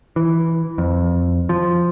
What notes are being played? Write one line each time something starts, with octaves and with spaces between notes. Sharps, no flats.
E3
F2
F3